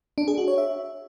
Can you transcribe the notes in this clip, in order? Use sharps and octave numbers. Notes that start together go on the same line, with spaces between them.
D4
G#4
F#4
C#5
E5